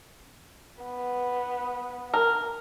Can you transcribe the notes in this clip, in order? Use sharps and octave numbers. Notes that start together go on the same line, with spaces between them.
B3
A#4